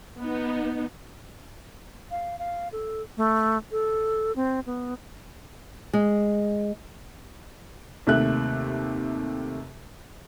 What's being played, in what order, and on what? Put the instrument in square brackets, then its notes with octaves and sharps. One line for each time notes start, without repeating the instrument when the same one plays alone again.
[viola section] B3 D#4
[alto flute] F5
F5
A4
A3
A4
C4
B3
[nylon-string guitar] G#3
[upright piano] D#2 C3 A3 E5 F#6